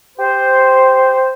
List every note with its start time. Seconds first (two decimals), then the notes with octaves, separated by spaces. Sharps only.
0.18 G4 C5